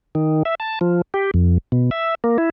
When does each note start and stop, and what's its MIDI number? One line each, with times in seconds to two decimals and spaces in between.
0.15 0.43 51
0.45 0.55 76
0.60 0.79 81
0.81 1.02 53
1.14 1.31 67
1.34 1.58 41
1.72 1.90 47
1.91 2.15 76
2.24 2.38 58
2.38 2.50 64